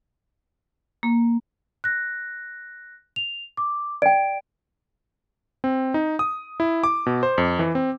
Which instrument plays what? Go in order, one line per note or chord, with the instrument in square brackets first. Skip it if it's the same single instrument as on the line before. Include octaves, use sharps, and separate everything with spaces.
[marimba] A#3
[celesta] F#6 A#6
F7
D6
[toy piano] D5 G5 [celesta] D7
[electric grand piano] C4
D#4
D#6
E4
D6
B2
C5
F2
E3
C4